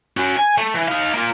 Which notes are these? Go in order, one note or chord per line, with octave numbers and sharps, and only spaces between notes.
C#4 F#4
G#5
A3
E3
D#4 F5
A#3 F4